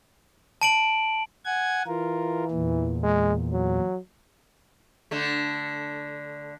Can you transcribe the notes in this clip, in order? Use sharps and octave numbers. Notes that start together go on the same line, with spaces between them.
A5 D7 F#7
F#5 G#5 G#6
E3 F4 A#4
E2 A#2
G#3
F#3
D3 A3